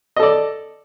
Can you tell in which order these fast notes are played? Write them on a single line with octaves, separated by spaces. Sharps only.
D#5 A4 D5